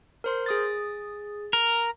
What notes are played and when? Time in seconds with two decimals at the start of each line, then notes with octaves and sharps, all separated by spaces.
0.24 A#4 C5 C6
0.46 G#4 D#6 A6
1.53 A#4